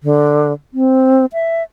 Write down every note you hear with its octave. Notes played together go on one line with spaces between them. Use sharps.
D3
C4
E5